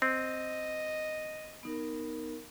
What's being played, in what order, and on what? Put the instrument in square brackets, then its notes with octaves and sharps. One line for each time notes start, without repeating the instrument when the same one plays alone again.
[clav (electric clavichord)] C4 [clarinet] D#5
[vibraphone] B3 D#4 A#4